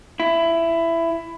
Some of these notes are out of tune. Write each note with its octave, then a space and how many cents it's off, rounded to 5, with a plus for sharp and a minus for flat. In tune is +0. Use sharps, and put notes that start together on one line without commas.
E4 +15